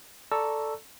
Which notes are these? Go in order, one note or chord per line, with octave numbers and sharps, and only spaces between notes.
A4 D5 A5 A#5 C#6 E6